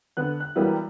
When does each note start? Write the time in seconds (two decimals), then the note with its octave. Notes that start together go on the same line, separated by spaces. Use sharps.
0.17 D3 B3 F#6
0.40 F#6
0.55 E3 F#3 G3 A#3 B3 E4